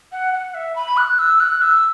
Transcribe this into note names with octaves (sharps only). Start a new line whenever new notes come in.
F#5
F#5
E5
B5
F#6
E6
F#6
E6